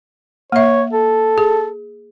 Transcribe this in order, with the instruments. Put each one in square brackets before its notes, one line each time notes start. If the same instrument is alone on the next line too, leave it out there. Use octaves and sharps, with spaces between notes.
[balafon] A#3 E5 [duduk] C#5
[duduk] A4
[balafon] G#4